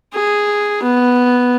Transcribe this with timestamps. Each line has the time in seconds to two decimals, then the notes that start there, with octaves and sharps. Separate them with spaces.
0.14 G#4
0.83 B3